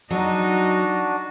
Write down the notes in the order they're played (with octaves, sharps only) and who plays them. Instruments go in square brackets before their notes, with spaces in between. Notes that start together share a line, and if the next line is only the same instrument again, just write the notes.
[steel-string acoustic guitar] F#3 [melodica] D4 F#4 [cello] D#4